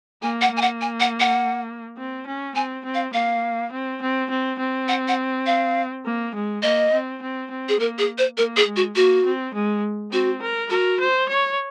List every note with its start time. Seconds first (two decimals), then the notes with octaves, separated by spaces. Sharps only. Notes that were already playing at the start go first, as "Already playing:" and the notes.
0.23 A#3 G#5
0.41 F#5
0.52 A#3
0.57 G#5
0.62 F#5
0.81 G#5
1.00 F#5
1.20 F#5
1.97 C4
2.26 C#4
2.55 C4 G#5
2.84 C4
2.94 F5
3.14 A#3 F5
3.72 C4
4.01 C4
4.30 C4
4.59 C4
4.88 F#5
5.08 F#5
5.46 F5
6.05 A#3
6.34 G#3
6.63 A#3 D#5
6.92 C4
7.21 C4
7.50 C4
7.69 G#4
7.79 A#3 A#4
7.99 G#4
8.18 C5
8.38 A#3 A#4
8.57 G#4
8.67 G#3
8.76 F#4
8.96 A#3 F#4
9.25 C4
9.54 G#3
10.12 C4 F#4
10.41 A#4
10.70 F#4 A#4
11.00 C5
11.28 C#5